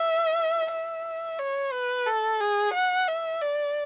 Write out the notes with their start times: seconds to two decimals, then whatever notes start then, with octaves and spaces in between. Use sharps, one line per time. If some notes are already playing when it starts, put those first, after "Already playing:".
Already playing: E5
0.71 E5
1.39 C#5
1.73 B4
2.06 A4
2.41 G#4
2.74 F#5
3.08 E5
3.42 D5